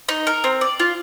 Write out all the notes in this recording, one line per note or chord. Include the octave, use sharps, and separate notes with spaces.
D#4
A#4
C4
D5
F4